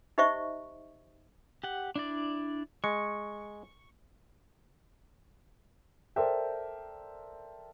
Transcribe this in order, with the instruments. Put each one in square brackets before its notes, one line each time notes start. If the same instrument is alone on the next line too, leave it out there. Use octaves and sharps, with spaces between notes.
[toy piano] D#4 G4 C5 D#5 E5 C#6
[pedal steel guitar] G4 F#5
D4 E4 D5
[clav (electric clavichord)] G#3 [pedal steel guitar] C#6
[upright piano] A4 A#4 C5 D5 E5 G5